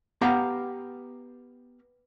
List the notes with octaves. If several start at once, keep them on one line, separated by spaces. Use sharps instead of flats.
B3 G4 F5 F#5 A#5